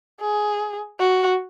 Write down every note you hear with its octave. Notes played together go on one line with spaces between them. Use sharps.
G#4
F#4